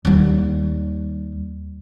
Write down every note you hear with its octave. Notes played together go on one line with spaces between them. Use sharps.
D#2 G3